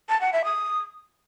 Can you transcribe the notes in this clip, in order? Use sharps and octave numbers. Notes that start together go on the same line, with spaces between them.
A5
F#5
E5
D#6